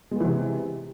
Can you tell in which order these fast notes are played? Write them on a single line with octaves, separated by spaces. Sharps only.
G#3 B3 E3 C3